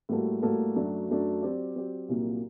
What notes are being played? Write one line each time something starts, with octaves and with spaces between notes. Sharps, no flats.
A2 G3 A#3 F#4 A4
A2 G3 A#3 F#4 A4
F#2 F#3 A3 D4
F#2 F#3 A3 D4
F#3 C4 G4 D5
F#3 C4 G4 D5
C2 A#2 F#3 A#3